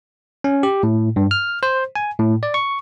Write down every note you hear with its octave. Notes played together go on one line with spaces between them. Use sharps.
C#4
G4
A2
G2
F6
C5
G#5
A2
D5
C#6